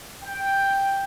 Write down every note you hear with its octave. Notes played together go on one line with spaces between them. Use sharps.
G5